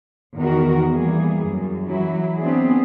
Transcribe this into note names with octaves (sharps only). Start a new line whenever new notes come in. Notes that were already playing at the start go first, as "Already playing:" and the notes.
E2 D#3 F#4 A#4
E3 G3 A#3 G#4
F#2
E3 F#3 E4
B3 C4 D4 G#4